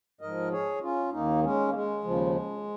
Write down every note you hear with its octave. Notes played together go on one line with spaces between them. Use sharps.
G#2 F3 A#4 D#5
G#4 C#5
C#4 F4
D#2 D#3 A#3 D#4
G#3 C#4
A#3
G#3
D#2 C#3 F3